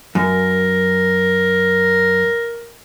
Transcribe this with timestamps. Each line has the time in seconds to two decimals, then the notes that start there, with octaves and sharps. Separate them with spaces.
0.15 F#2 A#4